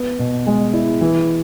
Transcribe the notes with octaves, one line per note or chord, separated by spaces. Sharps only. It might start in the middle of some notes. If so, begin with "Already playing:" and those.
Already playing: B3
B2
G#3
E4
E3